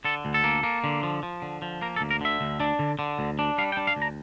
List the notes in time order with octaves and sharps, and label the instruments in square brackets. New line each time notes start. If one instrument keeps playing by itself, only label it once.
[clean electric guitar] D3 A4
D2
A4
A#3
A#3
D3
F3
F3
D3
F3
A#3 A#4
A4
D2
A#4
D3 E5
D2
D4
D3
D3
D2
D4
G3 F5
G5
D4
F5
D2
A#5